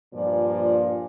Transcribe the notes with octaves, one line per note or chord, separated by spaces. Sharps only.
G2 A#2 F3 D5